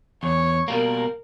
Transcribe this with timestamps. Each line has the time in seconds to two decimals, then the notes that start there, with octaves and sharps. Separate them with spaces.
0.23 E2 C#5
0.68 B2 G3 A#3 A#4